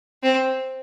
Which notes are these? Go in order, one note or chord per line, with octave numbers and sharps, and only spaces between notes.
C4